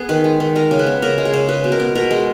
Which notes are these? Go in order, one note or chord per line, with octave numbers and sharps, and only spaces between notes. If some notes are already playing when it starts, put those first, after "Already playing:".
Already playing: B3 G#4
D#3 B4
G#3
D#3
G#3 A#4
C#3
B4
B3
C#3 A#4
G#3
G#4
C#3
G#3 B4
B2
A#4
B3
B2 A#4
G#3